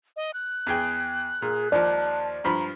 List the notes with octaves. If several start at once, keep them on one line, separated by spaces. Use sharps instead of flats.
D#5
F#6
E2 G#4 G5
A#2 G#4
D#2 F3 D5 A5
G2 F3 A#5 B5